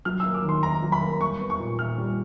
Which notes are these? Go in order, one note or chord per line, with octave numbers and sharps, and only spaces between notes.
F#3 F6
E6
A#3
D6
D#3
C6
D#3 A#5
F#3
B5
A#3
G3 C#6
B3
C#6
A#2
A#2 F6
G3